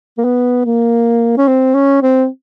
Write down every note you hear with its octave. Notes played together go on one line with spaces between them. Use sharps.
A#3
B3
A#3
C#4
C4
C#4
C4